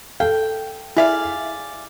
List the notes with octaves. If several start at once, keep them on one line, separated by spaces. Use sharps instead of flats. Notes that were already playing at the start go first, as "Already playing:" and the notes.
A4 F5 G5
E4 G#4 D5 E5 F5